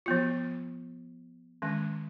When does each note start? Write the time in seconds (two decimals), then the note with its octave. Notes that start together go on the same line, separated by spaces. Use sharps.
0.06 F3 B3 F4
1.62 D#3 G#3 C#4